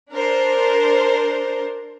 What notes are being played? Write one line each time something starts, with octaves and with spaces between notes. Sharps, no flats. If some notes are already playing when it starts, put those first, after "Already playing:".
D4 A#4 C5